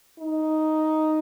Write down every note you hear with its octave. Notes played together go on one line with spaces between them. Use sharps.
D#4